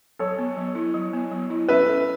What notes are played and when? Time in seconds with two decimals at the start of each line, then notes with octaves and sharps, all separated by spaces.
0.19 F#3 A4 C#5
0.39 B3
0.57 F#3
0.75 E4
0.94 F#3
1.13 B3
1.31 F#3
1.50 E4
1.69 C#4 B4 E5
1.88 A4